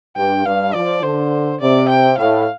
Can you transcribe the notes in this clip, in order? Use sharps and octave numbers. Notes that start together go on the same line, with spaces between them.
G2 G5
G2 F5
F3 D5
D3 C5
C3 D5
G5
A2 F5